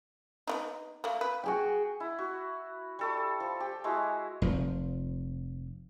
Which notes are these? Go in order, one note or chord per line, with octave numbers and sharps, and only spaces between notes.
B3 D4 D#4
A3 A#3
B4
F#4 G#4 G5
E4
F#4
G3 A4 C#6
F3
G4
G#3 E4 F#4
F1 F3